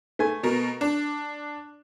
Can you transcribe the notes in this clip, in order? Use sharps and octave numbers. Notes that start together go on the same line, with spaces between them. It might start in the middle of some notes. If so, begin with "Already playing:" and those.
A3 G#5
B2 A#4
D4